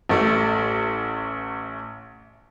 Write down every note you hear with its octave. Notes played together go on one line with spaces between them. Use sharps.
A1 A3